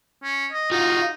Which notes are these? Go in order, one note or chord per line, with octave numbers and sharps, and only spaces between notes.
C#4
D#5
D#4 F4 F#4